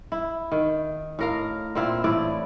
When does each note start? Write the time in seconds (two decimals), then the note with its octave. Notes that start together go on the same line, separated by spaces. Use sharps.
0.12 E4
0.52 D#3
1.19 A2 A#4 F5
1.75 A#2 C4 E4 F4
2.04 A2 E3 E4 D5